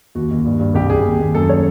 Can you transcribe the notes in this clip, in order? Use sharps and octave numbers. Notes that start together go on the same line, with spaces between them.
D#2 F#4
D#2
G2
G2
C2 G4
C2 G#4
D#2
D#2
F#2 A4
C#5